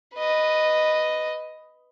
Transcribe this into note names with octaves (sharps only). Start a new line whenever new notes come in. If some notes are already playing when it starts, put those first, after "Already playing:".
B4 D#5